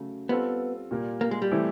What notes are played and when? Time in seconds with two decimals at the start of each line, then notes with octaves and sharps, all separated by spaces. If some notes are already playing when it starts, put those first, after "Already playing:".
Already playing: C#3 F#3 A3
0.29 G3 B3 C4 F4 A4
0.91 A#2 G3 A#3
1.21 A#3
1.31 G#3
1.42 G3
1.51 E3 A3 C4 E4 G4